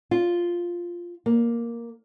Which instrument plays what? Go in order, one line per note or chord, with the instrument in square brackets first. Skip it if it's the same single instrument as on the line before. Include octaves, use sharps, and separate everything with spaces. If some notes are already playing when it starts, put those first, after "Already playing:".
[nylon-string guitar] F4
A#3